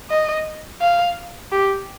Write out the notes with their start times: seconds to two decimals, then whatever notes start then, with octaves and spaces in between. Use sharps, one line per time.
0.10 D#5
0.81 F5
1.52 G4